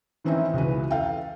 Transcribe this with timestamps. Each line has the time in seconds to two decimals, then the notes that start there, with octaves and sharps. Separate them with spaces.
0.24 D#3 E3 C4 C#4 D#4 E4
0.54 C#2 E3 F#4 B4
0.91 A4 F5 G5